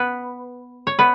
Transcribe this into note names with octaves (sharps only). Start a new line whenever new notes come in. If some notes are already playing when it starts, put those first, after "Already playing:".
Already playing: B3 B4
C#5
B3 B4